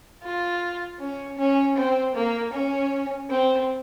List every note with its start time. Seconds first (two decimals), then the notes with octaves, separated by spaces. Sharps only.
0.23 F4
0.99 C#4
1.38 C#4
1.76 C4
2.15 A#3
2.53 C#4
3.30 C4